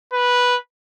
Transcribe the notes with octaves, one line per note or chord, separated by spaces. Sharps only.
B4